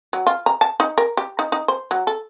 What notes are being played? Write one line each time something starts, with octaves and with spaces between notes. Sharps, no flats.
F#3
F4
A#5
A5
D#4
A#4
G4
D#4
D#4
C5
F#3
A4